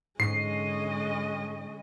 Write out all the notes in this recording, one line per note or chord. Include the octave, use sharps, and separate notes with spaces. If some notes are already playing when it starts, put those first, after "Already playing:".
G#2 D3 G#3 C#4 D#5 C7